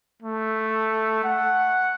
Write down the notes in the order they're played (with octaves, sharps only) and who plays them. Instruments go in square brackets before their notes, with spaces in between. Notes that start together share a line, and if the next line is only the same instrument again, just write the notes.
[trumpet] A3
F#5